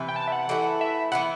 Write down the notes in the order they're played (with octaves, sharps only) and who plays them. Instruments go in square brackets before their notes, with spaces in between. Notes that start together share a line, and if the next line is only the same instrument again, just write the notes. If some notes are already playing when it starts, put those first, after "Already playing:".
Already playing: [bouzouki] C3 E3 B3
[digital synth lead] G5
A5
E5
F#5
[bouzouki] E3 A3 E4
[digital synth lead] E5
[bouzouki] E3 B3 E4 [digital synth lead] F#5